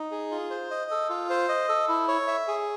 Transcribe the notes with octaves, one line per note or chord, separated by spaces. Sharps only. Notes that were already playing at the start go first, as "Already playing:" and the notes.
Already playing: D#4
G#4
F4
C5
D#5
A4
F4
C5
D#5
A4
E4
C#5
E5
G#4